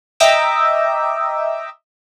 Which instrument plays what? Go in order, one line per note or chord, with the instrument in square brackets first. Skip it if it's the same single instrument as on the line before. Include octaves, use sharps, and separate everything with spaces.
[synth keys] D#5 E5 G5 A#5 D6 E6